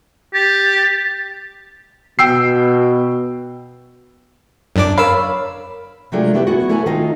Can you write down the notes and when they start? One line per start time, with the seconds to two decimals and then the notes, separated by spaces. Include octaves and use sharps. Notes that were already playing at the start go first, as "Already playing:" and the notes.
0.34 G4 A6
2.19 B2 G5 E6 C7
4.76 F#2 D4 D6
4.98 A#4 C#5 F5 B5 E6
6.12 C3 F#3 G#3 A3 D4 F4
6.34 A3 B3 E4 G4 A#4 B4
6.46 B3 E4 F#4 G#4
6.69 A3 E4 A4 B4 G#5 A#5
6.86 D#3 A3 C4 D#4 F4